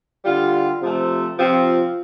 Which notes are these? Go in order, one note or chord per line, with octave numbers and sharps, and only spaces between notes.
D3 G3 F4
C3 F3 A3
C3 F3 C4 F4